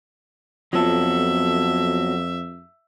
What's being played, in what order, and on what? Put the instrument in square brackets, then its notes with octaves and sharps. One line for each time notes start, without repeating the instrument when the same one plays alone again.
[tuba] F2 [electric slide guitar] F#3 B3 A4 [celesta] F4 [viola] E5